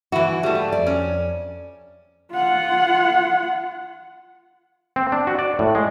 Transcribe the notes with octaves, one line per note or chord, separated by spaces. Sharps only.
E3 E4 F#4
G3 A3 G#4
F4
F2 D5
C#4
F4 F#5
C4
D4
F#4
D5
A2
G#3